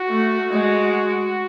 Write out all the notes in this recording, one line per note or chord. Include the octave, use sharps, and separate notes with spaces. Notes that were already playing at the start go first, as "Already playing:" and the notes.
Already playing: F#4
A3
G#3